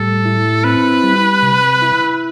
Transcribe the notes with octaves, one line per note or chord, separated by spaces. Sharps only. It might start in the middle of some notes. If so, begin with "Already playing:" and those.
Already playing: A2 G3 A4
E4
C4 B4
G3
C3
E4